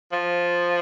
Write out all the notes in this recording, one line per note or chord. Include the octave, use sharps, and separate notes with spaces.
F3